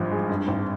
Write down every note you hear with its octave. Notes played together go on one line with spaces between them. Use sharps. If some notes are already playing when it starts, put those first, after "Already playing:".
Already playing: G#1 G2 F3
G#3
G2
G#1